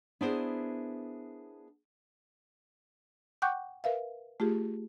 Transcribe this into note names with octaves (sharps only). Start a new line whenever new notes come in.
B3 D4 E4 G#4 A#4 C5
F#5 G5 C#6 D6 F#6 G6
A#4 B4 E5 F5
A3 F4 G4 G#4